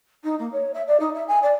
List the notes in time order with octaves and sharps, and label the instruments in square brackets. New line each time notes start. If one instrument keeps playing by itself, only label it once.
[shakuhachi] D#4
A#3
C#5
E5
D5
D#4
E5
G#5
D5